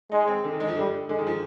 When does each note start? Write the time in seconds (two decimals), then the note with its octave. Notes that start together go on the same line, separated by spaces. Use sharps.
0.11 G#3 D#4
0.28 C4
0.44 D3
0.53 D#3
0.60 G#3
0.68 F3
0.76 D3 G3
1.09 D3 G#3
1.18 D#3
1.27 F3